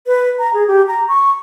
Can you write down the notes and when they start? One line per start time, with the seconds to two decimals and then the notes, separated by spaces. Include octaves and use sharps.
0.07 B4
0.39 A#5
0.54 G#4
0.68 G4
0.88 A#5
1.08 C#6